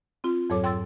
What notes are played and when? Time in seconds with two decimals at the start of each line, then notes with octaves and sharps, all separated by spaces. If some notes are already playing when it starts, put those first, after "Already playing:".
0.24 C4 F4
0.50 F2 G#2 F#3 A4 C#5 D6
0.64 G5 C6 E6 A6